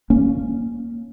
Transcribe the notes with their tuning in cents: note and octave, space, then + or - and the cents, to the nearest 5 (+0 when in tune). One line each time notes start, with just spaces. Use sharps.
A#3 +0 C#4 +0